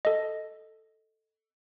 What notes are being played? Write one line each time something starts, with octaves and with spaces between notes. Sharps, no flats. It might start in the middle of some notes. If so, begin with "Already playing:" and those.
A4 D#5